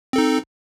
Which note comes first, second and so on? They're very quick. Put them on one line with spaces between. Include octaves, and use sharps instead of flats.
C4 A4 D#4